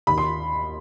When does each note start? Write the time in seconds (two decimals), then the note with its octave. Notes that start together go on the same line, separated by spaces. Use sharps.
0.07 D#2 B5
0.18 C6